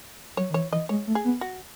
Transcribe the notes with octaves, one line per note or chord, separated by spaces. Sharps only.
F#3 C#5
D#3
E3 C#5
E3 D#5
G#3 C#5
A3
G#4
B3
F#4